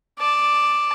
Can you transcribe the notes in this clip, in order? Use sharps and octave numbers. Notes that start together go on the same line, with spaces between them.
D5 A5